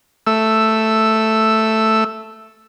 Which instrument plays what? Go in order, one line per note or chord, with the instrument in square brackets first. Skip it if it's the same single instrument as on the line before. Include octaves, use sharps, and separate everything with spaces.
[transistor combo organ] A3 E6